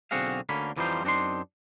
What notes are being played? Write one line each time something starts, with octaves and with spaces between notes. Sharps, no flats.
B1 D3 C4 F#4 G#4 F5
D2 D3 A#3 C#4 B5
F2 E3 F3 G3 D#4 C5
F#2 C4 D4 D#4 C6